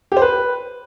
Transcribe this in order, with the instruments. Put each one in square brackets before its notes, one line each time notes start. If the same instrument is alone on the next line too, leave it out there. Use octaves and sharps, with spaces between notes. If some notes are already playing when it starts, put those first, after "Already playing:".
[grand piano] G4
C5
B4